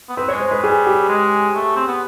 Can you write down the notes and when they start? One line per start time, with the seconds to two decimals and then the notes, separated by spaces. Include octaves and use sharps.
0.09 B3
0.17 C4 B4
0.28 C#5
0.32 G#3
0.40 C5
0.47 G#3 B4
0.62 G3 G#4
0.86 G4
1.08 G#3
1.55 A3
1.76 C4
1.87 B3